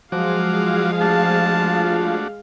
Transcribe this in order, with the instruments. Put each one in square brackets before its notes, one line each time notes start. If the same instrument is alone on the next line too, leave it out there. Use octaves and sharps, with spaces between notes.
[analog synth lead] F3 [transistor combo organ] F#3 F#4 D6 [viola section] G#3 G#4 F5
[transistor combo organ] A3 D4 F#4 [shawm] A5